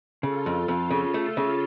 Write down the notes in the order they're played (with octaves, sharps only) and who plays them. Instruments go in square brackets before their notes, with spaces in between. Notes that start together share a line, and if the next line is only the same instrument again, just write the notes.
[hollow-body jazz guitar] C#3 [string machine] F4 A4
[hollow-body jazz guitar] F2
F2
C#3
A3
C#3